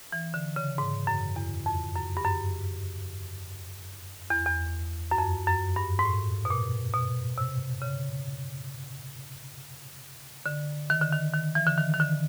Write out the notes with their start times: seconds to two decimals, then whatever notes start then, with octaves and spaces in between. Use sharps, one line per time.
0.12 E3
0.34 D3
0.56 C#3
0.78 G#2
1.07 F#2
1.36 E2
1.66 F2
1.96 F#2
2.17 G2
2.24 F#2
4.30 E2
4.46 E2
5.11 F#2
5.18 F2
5.47 F#2
5.76 G2
5.99 G#2
6.05 A2
6.45 B2
6.50 A#2
6.93 B2
7.38 C3
7.82 C#3
10.46 D3
10.90 D#3
11.01 D3
11.12 D#3
11.33 D#3
11.55 E3
11.67 D3
11.78 D#3
11.94 D#3
12.00 D3